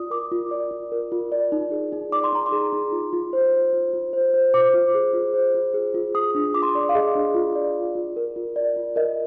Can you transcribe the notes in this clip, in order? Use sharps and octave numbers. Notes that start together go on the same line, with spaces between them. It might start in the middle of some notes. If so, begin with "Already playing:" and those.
Already playing: F4 D5 D#6
A#4 D6
F4
D5
F4
A#4
F4
D5
D#4
G#4
D#4
D5 D6
C6
D#4 A#5
C6
G#4
D#4
F4
F4
C5
C5
F4
F4
C5
C5
C5 D6
F4
G#4
F4
C5
F4
G#4
F4
G#4 D#6
D4
F4 D6
C6
D6
D5
F5
G#4 D#5
D4
F4
D5
D5
F4
A#4
F4
D5
F4
A#4 D#5